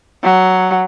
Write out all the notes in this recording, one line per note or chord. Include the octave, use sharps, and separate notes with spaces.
F#3